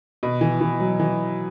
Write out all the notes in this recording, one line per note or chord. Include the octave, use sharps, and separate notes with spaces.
B2
E3
E3
F#3
E3